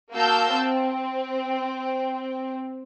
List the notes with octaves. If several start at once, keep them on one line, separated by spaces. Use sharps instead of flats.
A#3 F#4 F5 A5 E6 G6
C4